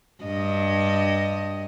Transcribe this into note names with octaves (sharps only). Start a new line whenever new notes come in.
G2 D#5